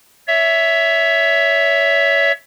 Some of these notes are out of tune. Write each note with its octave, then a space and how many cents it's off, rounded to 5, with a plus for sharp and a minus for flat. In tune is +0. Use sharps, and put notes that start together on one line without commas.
C#5 +25 E5 +0